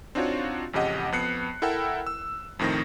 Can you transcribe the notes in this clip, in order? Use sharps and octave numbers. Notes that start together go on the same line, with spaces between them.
C4 D4 D#4 F4 F#4 C#5
A1 F2 C#3 G4 D#5 F#5
F2 B3 F#6 C7 C#7
E4 A4 A#4 F#5 G5 E6
E6
F2 A2 D#3 C4 A#6